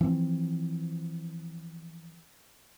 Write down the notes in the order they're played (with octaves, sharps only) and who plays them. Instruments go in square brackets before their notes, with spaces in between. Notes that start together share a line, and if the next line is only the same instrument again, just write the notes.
[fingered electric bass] E3 F3 C4